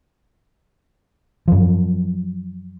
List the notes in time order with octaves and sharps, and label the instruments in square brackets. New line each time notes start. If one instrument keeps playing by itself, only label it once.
[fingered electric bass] F#2 F3